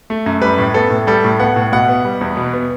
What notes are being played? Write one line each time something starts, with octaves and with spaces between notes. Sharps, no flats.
A3
F#2
G3 B4
A2
B3 A4
A2
G3 A4
A2
B3 F#5
A2
B2 F#5
B3
G3
E2
B2
B3